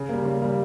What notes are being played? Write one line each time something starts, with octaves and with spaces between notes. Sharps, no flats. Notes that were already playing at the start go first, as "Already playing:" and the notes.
Already playing: C#3
G3 A#3
C#3
G3 A#3